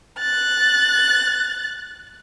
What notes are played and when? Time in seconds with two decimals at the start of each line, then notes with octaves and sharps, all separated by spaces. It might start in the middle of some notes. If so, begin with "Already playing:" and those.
0.20 F#6 A6